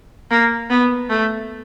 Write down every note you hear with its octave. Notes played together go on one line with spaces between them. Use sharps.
A#3
B3
A3